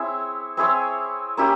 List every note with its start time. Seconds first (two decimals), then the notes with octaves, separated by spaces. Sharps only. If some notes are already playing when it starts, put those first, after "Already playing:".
Already playing: C4 E4 G#4 C#5
0.57 C4 E4 G#4 C#5
1.37 A#3 C#4 E4 G4